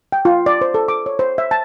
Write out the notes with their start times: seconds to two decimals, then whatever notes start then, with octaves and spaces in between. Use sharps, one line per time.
0.12 G5
0.25 F4
0.46 D5
0.61 C5
0.74 A4
0.88 D6
1.06 C#5
1.19 C5
1.38 E5
1.51 A5